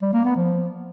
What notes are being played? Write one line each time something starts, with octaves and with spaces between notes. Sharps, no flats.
G3
A#3
B3
F3